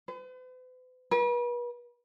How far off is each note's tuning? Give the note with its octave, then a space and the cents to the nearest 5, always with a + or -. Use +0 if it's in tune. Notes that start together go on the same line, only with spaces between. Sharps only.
B4 +45
B4 -40